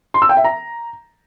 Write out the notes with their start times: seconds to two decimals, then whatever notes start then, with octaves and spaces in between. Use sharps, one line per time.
0.14 C6
0.22 E6
0.29 G5
0.37 E5
0.44 A#5